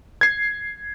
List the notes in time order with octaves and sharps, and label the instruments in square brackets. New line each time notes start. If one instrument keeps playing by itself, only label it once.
[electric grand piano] G#6 C7